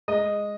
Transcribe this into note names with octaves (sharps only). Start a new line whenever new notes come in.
G#3 D#5